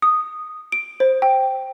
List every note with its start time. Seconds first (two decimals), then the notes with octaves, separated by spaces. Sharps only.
0.02 D#6
0.72 D7
1.00 C5
1.22 G5